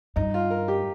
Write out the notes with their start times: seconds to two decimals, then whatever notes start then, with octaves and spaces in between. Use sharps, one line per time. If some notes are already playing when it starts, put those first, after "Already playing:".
0.16 G2 D#4
0.34 F4
0.50 A#4
0.68 G4